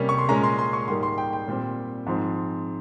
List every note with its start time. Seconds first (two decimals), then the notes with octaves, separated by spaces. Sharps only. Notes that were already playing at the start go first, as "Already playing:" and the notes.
Already playing: C3 G3 A#3 C#4
0.09 C#6
0.19 C6
0.29 A#2 G#3 C#4 A#5
0.43 C6
0.59 C6
0.73 C#6
0.88 G#2 G3 A#3 C6
1.03 C6
1.18 G5
1.33 G5
1.48 A#2 G3 C4
2.06 G#2 F3 C4